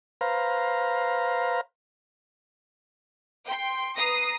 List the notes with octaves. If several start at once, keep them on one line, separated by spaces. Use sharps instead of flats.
B4 C5 F5 A#5
G5 C6
B4 A#5 D#6 A#6 C7